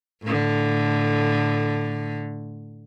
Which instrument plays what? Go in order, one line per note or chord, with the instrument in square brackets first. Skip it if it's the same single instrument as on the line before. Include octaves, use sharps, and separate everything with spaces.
[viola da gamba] A2 D3